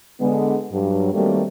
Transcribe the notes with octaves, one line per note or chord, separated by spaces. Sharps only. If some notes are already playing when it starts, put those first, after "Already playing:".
D3 G#3 B3
G2 F#3
D#3 F#3 G3 A3 A#3 C4